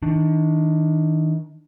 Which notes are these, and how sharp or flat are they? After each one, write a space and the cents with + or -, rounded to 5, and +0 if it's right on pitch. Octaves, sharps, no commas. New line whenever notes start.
D#3 +35 D4 +15